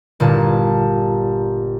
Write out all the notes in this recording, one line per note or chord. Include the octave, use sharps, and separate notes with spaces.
G1 A#2 A5